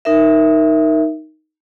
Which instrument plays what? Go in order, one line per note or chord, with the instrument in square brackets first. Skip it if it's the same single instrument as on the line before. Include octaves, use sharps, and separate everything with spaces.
[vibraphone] D#4 A#4 E5